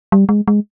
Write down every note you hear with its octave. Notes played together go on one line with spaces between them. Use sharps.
G3
G#3
G#3